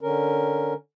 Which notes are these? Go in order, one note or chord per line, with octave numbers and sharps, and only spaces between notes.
D3 C#4 A#4